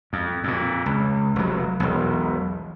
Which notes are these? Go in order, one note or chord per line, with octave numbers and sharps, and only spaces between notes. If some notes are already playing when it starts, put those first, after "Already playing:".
F2
F2 A#2
C#2
F1 F#3
E1 B1